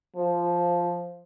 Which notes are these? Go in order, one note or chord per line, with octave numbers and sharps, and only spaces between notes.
F3